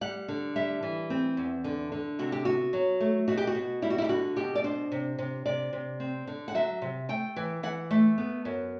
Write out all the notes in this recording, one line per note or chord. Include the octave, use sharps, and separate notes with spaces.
G3 F#5
D3
G3 E5
E3
C4
E2
D3
D3
C3 F#4
G4
B3 F#4
F#3
A3
B2 F#4
G4
F#4
B2
G3 E4
F#4
E4
G4
D3 F#4
B2 G4
D5
D4 C5
C3
C3
C3 D5
C3
C4
D3
F#5
F#3 E5
C3
A3 G5
E3
E3 F#5
A3
B3
F#2